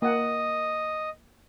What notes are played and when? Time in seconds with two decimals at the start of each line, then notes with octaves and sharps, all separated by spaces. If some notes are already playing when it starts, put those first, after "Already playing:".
0.02 A#3 D#5 F#5